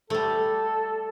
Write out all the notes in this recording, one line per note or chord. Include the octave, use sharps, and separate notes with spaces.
G3 A3 A4